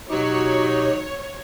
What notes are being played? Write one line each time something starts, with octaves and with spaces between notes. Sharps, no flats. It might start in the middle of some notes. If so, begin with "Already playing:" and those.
B2 F#3 D#4 F#4 G4 C#5